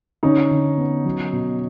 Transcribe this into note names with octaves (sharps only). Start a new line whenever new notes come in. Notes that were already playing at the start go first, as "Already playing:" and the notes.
D3 C#4 D#4
D3
B3
F#3
B2